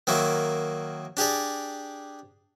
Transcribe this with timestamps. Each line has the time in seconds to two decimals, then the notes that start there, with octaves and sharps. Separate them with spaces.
0.07 D#3 F#3 A#3 E4
1.17 D4 G4 G#4 D5